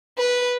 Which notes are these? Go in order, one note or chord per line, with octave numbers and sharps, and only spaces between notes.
B4